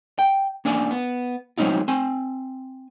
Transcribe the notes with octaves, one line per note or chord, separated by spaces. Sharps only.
G5
A#3 C#4 D4 D5 F5 G#5
B3
F#3 G#3 C4 C#4 D#4 F4
C4 G#5